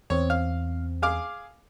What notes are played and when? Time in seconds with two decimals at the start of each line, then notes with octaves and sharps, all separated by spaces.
0.10 E2 C4 C#5
0.30 F5
1.02 G#4 F5 D6